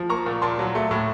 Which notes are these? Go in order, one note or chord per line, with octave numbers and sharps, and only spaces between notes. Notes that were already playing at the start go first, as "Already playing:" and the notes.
Already playing: F3
A#3 A#5 C#6
A#2
A#2 A5 C6
F#3
A3
A2